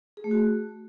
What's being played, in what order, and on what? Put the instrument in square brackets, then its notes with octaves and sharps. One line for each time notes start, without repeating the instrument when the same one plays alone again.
[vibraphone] G#4
A3
F#4